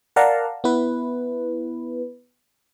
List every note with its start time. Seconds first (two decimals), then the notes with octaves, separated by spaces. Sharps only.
0.16 A#4 D5 F5 F#5 A5 A#5
0.64 B3 E4 B4